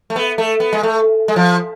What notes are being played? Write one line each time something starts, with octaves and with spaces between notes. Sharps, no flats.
A3
B3
A3
B3
G#3
A3
G#3
F3